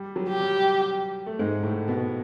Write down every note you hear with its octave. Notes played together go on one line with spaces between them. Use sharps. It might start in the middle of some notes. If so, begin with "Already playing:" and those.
Already playing: G3
F#3
G4
G3
A3
G#2 G#3
A2 A3
B2 B3